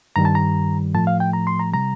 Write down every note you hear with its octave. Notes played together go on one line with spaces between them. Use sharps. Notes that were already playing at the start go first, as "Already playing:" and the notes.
G2 D#3 G3 A#5
A5
A#5
A2 F3 A3 A5
F5
G5
A#5
C6
A#5
C3 G3 A#5